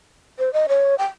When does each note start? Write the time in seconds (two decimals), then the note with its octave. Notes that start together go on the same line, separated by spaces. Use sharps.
0.39 C5
0.53 D#5
0.69 C#5
0.98 G5